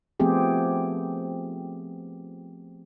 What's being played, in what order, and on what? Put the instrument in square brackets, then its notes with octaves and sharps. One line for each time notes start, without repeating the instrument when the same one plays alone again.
[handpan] F3 A3 B3 C4 G4 G#4